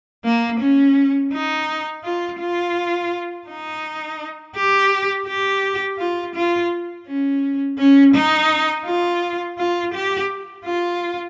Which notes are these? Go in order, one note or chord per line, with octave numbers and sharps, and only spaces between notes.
A#3
C#4
D#4
F4
F4
D#4
G4
G4
F4
F4
C#4
C#4
D#4
F4
F4
G4
F4